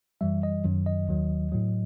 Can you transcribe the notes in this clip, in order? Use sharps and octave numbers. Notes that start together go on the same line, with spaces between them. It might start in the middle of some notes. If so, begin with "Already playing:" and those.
F#2 E3 G3 E5
D#5
F#2 D#3 F#3
D#5
D#2 D#3 F#3
A2 F#3